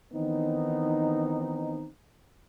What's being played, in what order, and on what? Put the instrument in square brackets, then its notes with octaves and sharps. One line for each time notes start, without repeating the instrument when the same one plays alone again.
[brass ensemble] D#3 E3 B3 C4 D#4